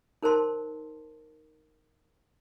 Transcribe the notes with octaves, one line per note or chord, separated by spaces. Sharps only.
D#4 A#4 C5 A5 C6